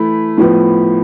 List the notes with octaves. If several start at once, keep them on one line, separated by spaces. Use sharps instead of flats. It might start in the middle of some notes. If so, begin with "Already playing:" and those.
Already playing: E3 A3 E4 B5
A2 F3 B3